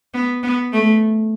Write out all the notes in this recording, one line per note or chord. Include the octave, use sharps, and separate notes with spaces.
B3
B3
A3